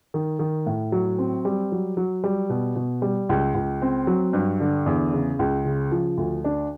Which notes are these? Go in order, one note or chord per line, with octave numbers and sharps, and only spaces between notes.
D#3
D#3
A2
F#3
C4
G3
F#3
F#3
G3
B2
B2
G3
C#2
C#2
C4
F#3
G2
D3
E2
C#3
C#2
C#3
F3
D2
D4